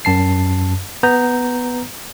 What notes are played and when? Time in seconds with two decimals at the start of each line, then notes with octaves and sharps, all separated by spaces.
0.05 F#2 A5 C7
1.03 B3 A#5 G6